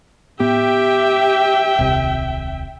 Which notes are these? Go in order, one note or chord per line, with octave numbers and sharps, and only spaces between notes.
A2 B3 G4 E5 G5
D#1 C2 C3